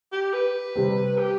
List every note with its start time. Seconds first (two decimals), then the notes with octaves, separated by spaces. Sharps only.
0.12 G4
0.33 B4
0.76 C3 G3 C4
1.18 G4